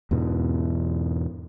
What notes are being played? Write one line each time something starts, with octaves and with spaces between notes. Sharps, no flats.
E2 G#2 B2 E3